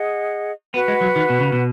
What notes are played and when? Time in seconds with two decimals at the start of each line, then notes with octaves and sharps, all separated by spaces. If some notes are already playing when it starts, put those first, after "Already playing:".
Already playing: G#4 D#5 F#5
0.74 B3 F#4 B4 F#5
0.88 G#3
1.01 F#3
1.16 D#3
1.30 B2
1.40 C#3
1.52 B2